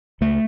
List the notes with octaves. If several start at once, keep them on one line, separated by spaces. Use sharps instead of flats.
C#2 A3